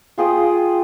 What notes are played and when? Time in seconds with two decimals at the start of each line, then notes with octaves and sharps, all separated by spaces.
0.18 F4 G#4 G5 D#6